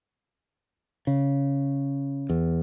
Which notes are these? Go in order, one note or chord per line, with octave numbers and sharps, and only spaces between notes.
C#3
E2